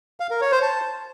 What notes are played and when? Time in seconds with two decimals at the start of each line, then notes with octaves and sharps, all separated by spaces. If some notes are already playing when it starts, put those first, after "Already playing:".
0.20 F5
0.31 A#4
0.41 C#5
0.52 C5
0.62 A5